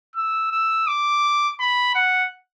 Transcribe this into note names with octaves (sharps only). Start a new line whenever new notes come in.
E6
E6
D6
B5
F#5